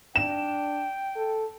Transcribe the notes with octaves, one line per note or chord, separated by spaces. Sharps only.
D4 G5 E7
A4